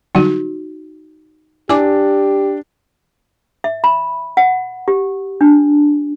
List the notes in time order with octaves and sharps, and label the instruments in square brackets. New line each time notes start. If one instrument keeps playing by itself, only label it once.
[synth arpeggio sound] D3 F#3 G3 [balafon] D#4 F#4
[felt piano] D4 [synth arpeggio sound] E4 [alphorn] G4 [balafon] G#5 D6
[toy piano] E5
B5
F#5
G4
D4